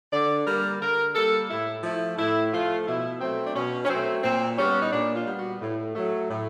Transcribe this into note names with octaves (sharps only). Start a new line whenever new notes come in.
D3 D5
G3 A#3 A#4
D3 A#4
G3 A#3 A4
A2 E4
F3 A3 E4
A2 E4
F3 A3 F4
B2 E4
F#3 A3 C4
D4
B2 C#4
C#4
F#3 A3 C4
A#2 C4
G3 B3 C#4
D#4
A#2 D4
F4
G3 B3
F#4
A2
F#3 A3
A2